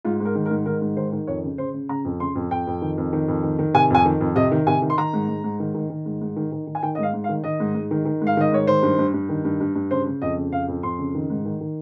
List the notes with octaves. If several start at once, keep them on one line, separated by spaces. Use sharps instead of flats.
G#2 F4
G#2
A#4
D#3
A#4
G#2
D#3 A#4
G#2
D#3 C5
D#3
F2 C#5
C#3
C#3 C5
C#3
C#3 A#5
F2
C#3 C6
F2
F2 G5
F2
D#3
F2
D#3
F2
D#3
D#3
C3 G#5
F2 G#5
D#3
F2
C3 D#5
D#3
C3 G#5
D#3
C6
D#3 A#5
G#2
G#2
G#2
D#3
D#3
D#3
G#2
G#2
D#3
D#3
D#3
G#5
D#3 G5
D#5
G#2 F5
G#2
F5
D#3
D#3 D#5
G#2
G#2
D#3
D#3
G#2
F5
D#3 D#5
G#2 C#5
D#3 C5
G2
G2
G2
D#3
G2
G2
G2
C#3 C5
C#3
F2 D#5
C#3
F2 F5
F2
F2 C6
C#3
D#3
G#2
D#3
D#3